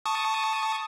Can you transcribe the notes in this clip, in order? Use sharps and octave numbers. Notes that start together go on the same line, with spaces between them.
A5 C#6 D#6